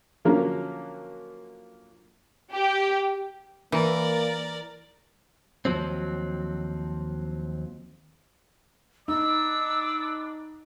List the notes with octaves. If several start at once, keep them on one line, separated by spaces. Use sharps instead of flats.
D3 F3 F#3 A#3 C#4
G4
E3 A#3 A#4 D5
D#2 A2 F3 F#3 C4
B3 D4 D#4 D5 E6